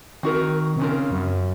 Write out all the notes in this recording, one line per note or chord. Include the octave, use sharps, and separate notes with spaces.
D#3 C4 F#4 A#4
C3
C#3 C4 F4 A#4
F#2